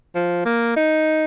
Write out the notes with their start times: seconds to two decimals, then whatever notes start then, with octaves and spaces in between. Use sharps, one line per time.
0.15 F3
0.45 A#3
0.76 D#4